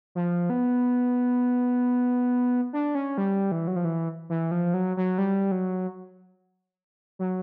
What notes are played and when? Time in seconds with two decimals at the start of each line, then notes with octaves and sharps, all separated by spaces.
0.15 F3
0.50 B3
2.73 D4
2.95 C#4
3.18 G3
3.52 E3
3.67 F#3
3.76 F3
3.85 E3
4.29 E3
4.51 F3
4.74 F#3
4.97 F#3
5.18 G3
5.52 F#3
7.19 F#3